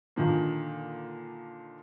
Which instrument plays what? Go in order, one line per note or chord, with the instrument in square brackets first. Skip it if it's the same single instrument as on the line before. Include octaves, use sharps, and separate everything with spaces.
[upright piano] A#2 D3 D#3 F3 A#3